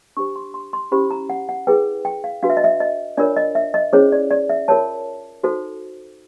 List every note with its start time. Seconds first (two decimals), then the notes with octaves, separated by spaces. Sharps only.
0.17 D4 G4 C5 C#6
0.36 C6
0.54 C6
0.73 C6
0.92 C#4 E4 G4 C5 B5
1.11 A#5
1.30 F#5
1.49 F#5
1.67 E4 G#4 B4 G5
2.05 G5
2.24 F5
2.43 D4 F#4 B4 F5
2.50 E5
2.57 D#5
2.64 E5
2.80 D#5
3.17 D4 F4 A#4 C#5 D5
3.36 D#5
3.55 E5
3.74 D#5
3.93 C#4 E4 G#4 C5 C#5
4.12 D5
4.31 D5
4.49 E5
4.68 F4 A#4 C#5 A5
5.43 D#4 F#4 A4 C5